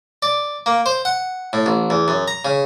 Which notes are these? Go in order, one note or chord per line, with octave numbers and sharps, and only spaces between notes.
D5
A#3
C5
F#5
A2
A1
E2
F#2
A#5
C#3